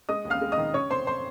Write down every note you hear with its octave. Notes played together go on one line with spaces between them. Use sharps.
G#3 D#5 D#6
D#2
F5 F6
G#3
D#5 D#6
D#3
C#3 C#5 C#6
F1 C5 C6
C5 C6